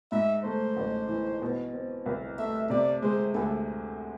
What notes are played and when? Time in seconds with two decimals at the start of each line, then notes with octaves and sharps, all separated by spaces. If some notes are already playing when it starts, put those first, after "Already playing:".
0.12 G#2 E5
0.44 A3 C5
0.77 A1
1.08 E3
1.42 B2
1.73 C4
2.06 C2
2.38 A3 E5
2.70 C3 D5
3.02 G#3 C5
3.34 D2 A4